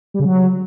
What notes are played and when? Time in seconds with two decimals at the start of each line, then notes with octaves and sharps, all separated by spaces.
0.14 G3
0.19 C#3
0.25 F#3